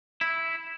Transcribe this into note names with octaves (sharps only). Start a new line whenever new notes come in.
E4